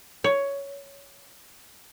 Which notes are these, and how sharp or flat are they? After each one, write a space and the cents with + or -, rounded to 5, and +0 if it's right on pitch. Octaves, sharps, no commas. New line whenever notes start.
C#5 +10